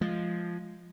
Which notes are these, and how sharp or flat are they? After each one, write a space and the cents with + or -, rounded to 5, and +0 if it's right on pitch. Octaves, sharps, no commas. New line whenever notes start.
F3 -5 G#3 +0